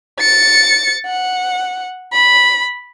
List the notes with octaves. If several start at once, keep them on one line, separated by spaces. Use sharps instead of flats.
A6 C#7
F#5
B5